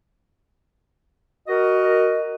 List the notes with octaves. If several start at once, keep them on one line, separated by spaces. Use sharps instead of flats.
F#4 A#4 D#5